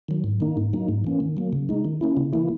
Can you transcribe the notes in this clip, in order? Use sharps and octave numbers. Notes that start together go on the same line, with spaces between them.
D#3 F#3
G#2
D#3 A#3 D#4
G#2
F#3 A#3 D#4
G#2
E3 A#3 C#4
D#3
F#3 A#3
C#3
G#3 D#4
D#3
A#3 C#4 E4
C#3
E3 A#3 E4